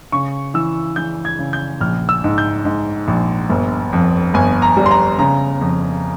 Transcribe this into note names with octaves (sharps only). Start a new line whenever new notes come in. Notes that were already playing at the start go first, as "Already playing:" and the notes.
C#3 C#6
E3 E6
E3 G6
G#6
C#3
G6
A#1 F6
E6
G#2
G6
G#2
A#1
G1
F2
G1 G#5
A#5
G3
C6
A#5
C#3 A#5
F2